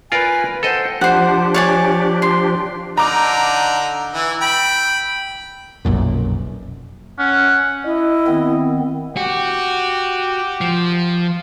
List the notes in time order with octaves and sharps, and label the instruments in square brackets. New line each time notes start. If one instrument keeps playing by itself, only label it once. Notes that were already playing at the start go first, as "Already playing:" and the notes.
[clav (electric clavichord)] F4 A#4 D5 [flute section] B4 G#5
[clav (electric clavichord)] A4 D#5 [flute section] C5 F#5 G5
[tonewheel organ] F3 D4 G4 [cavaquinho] C5 F#5
[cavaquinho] C#5 D5 G#5
C6
[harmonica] D3 D#4 [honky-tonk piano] A#5 D6
[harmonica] E3
G5 B5
[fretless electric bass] F1 B1 F#2 A#2
[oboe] C#4 [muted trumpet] F#5
[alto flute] E4 [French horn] D#5
[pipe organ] D#3 B3 C4
[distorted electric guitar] F#4 [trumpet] G4
[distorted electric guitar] F3